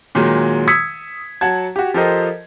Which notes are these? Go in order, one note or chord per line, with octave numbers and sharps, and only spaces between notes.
A#2 D#3 F#3 G#3
D#6 E6 G#6 B6 C#7
F#3 F#5 A5 G#6
F#4 G4
F3 G4 A4 A#4 C5 D#5